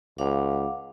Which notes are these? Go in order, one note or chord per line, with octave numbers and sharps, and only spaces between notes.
C#2 F5 F#5 D6